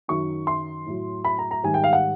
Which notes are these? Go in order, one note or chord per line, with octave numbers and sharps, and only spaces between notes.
F#2 D#3 F#3 C#6
C6
A2 F#3
B5
A#5
A#5
G#2 D#3 G3 G#5
G5
F5
F#5